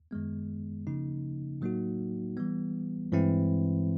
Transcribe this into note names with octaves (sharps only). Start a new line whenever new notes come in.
F#2 D#3 G#3 B3
C#3 F3 A#3 D#4
A2 F#3 A#3 D#4 F#4
E3 G3 B3
G2 E3 G#3 C4 E4